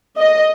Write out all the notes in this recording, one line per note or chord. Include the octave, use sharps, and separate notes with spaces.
D#5